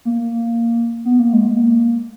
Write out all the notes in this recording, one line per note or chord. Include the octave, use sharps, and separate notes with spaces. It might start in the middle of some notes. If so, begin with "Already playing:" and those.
A#3
B3
A#3
G#3
A#3